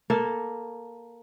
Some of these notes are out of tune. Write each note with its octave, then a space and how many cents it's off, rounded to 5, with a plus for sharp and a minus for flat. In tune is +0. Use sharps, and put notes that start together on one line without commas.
A#3 +10 A4 +0